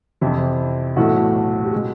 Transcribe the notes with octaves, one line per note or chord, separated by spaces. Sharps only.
F2 C3 E3 E4
B1 A2 E3 A3 F#4
G4
B2 G#3 G#4